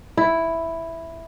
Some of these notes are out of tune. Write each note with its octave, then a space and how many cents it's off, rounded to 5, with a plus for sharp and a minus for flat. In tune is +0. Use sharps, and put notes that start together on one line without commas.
E4 +0